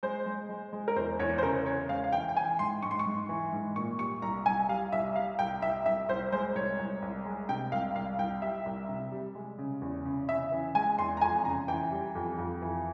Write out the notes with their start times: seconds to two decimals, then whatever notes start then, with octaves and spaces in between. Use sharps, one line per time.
0.03 G#3 C5
0.26 G#3
0.49 G#3
0.73 G#3
0.88 A#4
0.96 E2 C5
1.19 E2 C#5
1.38 C5
1.43 C#3 A#4
1.66 C#3 C#5
1.89 G#3 F5
2.04 F5
2.12 E3 G5
2.29 G5
2.36 E3 G#5
2.59 G#2 C6
2.83 G#2 C#6
2.91 C6
2.99 C#6
3.06 G#2
3.29 E3
3.53 G#2
3.76 A#2 C#6
3.99 G3 C#6
4.22 C2 A#5
4.45 C2 G#5
4.69 G3 F5
4.92 C2 E5
5.16 G3 F5
5.39 C2 G5
5.62 C2 E5
5.86 C2 E5
6.09 C2 C5
6.32 G#3 C5
6.55 C2 C#5
6.79 C2
7.02 C2
7.26 G#3
7.49 C3 G5
7.72 C2 F5
7.95 C2 F5
8.18 C2 G5
8.42 G3 E5
8.66 C2
8.89 C3
9.12 G3
9.35 G#3
9.58 C#3
9.82 E2
10.05 C#3
10.28 C#3 E5
10.52 E3
10.75 G#3 G#5
10.98 E2 C6
11.17 A#5
11.21 F2 G#5
11.45 C#3 A#5
11.68 E3 G5
11.91 G3
12.15 F2
12.38 F2
12.62 E3